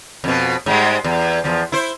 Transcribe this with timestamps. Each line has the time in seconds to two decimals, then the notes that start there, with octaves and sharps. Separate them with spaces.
0.24 F2 B2
0.66 G#2 G3 G#3
1.04 E2
1.44 E2 F3
1.72 E4 C5